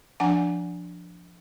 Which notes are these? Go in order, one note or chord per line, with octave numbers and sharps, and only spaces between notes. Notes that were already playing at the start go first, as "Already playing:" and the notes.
F3 D4 F#5 G#5